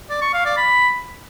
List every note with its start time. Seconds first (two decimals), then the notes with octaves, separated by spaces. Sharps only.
0.10 D5
0.22 C#6
0.33 F5
0.45 D5
0.57 B5